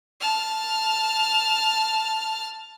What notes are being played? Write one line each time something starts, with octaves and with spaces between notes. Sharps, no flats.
A5 F6